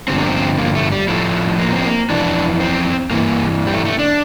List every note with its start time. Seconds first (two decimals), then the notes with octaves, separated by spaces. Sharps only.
0.08 G2 D3 F3 C4
0.17 A#3
0.27 C4
0.58 A#3
0.75 A3
0.92 G3
1.08 A2 F3 A3
1.59 A#3
1.73 C4
1.85 A#3
2.10 F2 E3 D4
2.60 C4
3.10 G2 E3 A#3
3.67 G3
3.73 A3
3.85 A3
3.99 D4